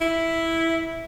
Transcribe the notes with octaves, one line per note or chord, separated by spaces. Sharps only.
E4